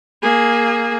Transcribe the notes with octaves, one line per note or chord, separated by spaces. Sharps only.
A#3 G#4